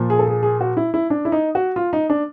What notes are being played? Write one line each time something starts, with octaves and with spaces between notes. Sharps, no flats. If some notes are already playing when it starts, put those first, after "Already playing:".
Already playing: A#2 F3
G#4
A4
G#4
G#4
F#4
E4
E4
D4
E4
D#4
F#4
F4
D#4
D4